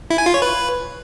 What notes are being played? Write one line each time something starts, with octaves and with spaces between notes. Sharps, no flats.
E4
G#5
F4
C#5
B4